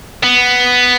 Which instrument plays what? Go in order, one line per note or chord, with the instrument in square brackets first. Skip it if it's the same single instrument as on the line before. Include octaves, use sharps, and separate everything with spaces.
[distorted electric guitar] B3